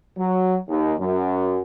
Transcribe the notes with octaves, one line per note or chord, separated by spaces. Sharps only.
F#3
D#2
F#2